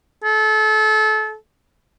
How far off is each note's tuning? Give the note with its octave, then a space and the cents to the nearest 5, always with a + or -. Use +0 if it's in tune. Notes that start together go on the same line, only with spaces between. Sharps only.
A4 -30